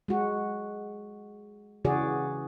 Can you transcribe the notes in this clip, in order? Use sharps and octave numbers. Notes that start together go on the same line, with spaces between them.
G#3 F#4
C#3 E3 F#4 G#4 D5